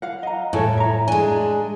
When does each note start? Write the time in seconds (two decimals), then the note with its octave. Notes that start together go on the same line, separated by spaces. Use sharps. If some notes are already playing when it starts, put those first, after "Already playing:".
0.02 F5 F#5
0.23 D#5 A#5
0.53 A2 G#4 A4 C#5
0.77 E5 A#5
1.08 G#3 D4 G#5